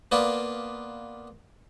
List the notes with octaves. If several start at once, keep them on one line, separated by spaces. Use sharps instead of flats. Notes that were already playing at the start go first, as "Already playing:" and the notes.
A#3 B3 F4 B4 D5